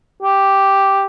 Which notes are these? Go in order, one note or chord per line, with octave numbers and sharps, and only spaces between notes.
G4